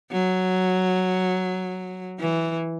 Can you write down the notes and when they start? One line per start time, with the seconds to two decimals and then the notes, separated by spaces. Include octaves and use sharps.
0.12 F#3
2.19 E3